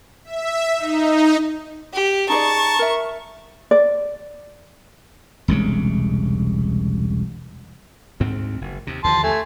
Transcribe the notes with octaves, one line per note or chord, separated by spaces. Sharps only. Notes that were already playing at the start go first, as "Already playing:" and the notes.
E5
D#4
G4
D#4 G#4 D5 A5 A#5 C#6
A#4 E5
D5
E1 C2 C#3 G#3
D2 G#2 C4
F#1
D#2 C3
D#2 D3 F3 A5 C6
A3 G#5